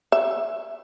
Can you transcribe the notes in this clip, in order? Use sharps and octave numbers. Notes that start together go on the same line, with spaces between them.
E5